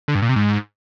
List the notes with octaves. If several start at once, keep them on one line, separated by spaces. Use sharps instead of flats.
D3
G2
A#2
C3
G#2